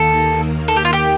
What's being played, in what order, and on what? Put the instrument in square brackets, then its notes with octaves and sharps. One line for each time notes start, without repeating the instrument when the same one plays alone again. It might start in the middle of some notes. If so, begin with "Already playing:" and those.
Already playing: [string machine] D#2 D#3 A#3 [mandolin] A4
[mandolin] A4
G4
F4
G4